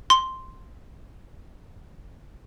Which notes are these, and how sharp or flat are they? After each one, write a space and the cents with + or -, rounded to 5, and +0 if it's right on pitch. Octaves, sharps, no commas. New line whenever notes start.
C6 +0